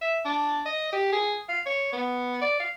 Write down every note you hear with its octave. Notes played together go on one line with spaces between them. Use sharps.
E5
D4
D#5
G4
G#4
F5
C#5
B3
D5
F5